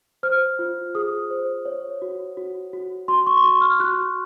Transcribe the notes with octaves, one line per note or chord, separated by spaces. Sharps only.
C5 F6
F4
G#4 D#6
C5
C#5
F#4
F#4
F#4
F#4 C6
C#6
C6
F#4 C#6
F6
F#4 F#6